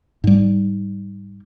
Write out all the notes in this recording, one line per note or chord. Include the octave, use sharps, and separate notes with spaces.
G#2 G3